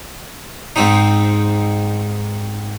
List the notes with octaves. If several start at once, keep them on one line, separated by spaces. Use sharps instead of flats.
G#2 C4 D#4